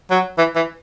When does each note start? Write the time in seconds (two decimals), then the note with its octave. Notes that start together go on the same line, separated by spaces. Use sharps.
0.11 F#3
0.38 E3
0.56 E3